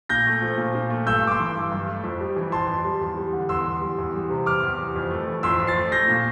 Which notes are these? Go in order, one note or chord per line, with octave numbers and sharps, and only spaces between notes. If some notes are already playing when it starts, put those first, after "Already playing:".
A#2 G6 A#6
A3
F3
A#2
A#2
A3
G2 E6 G6
A3 D6
C6 E6
E3
G2
G2
A3
F2
G3
E3
F2 A5 C6
F2
G3
E2
G3
D3
E2 C6 E6
E2
G3
E2
G3
C3
E2 D6 F6
E2
G3
F2
A3
E3
F2 C6 E6
F2
A6 C7
A3
A3 G6 A#6
A#2